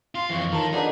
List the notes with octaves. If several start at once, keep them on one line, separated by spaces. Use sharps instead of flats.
F4 C6
F2 E3 F4 C#5
D#3 A#4 C#5 A5
D3 D#4 G#4 B4